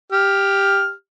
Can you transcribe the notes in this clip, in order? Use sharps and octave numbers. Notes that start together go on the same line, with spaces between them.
G4 F6